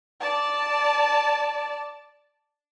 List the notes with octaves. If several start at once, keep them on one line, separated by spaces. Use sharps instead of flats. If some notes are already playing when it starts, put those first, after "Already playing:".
D5 A5